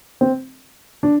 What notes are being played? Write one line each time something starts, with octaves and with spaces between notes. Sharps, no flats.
C4
D4